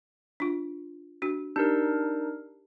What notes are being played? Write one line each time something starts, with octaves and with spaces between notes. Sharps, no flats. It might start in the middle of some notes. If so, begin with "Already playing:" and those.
D4 F4
D4 F#4
D4 D#4 G4 A#4